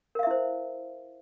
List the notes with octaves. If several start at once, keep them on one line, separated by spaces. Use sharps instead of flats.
E4 A#4 C5 E5 F5